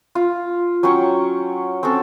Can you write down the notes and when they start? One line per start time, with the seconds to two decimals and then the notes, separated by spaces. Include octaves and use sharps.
0.15 F4
0.83 F#3 C#4 G5 C#6
1.83 C4 C#4 F#4 A4